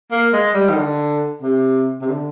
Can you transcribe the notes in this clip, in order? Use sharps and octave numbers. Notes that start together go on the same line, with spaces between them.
A#3
G#3
G3
D#3
D3
C3
C3
D3